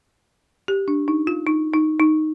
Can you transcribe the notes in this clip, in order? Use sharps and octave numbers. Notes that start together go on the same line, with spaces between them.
G4
D4
D#4
F4
D#4
D#4
D#4